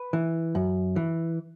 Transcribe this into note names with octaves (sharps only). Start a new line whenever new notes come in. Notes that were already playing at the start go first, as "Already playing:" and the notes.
Already playing: B4
E3
F#2
E3